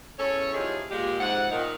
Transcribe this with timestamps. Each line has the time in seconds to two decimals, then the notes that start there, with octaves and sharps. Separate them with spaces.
0.19 E2 C#4 A4 C#5
0.54 E2 F3 D#4 G4 G#4 C#5
0.91 A#2 G#3 G4
1.20 F2 G#2 C3 F#5
1.51 A#2 D#3 D#4